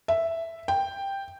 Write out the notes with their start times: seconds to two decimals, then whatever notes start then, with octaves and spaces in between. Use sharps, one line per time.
0.08 E5
0.68 G5